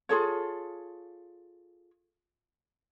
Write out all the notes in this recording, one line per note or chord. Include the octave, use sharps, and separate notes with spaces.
F4 G#4 A4 C#5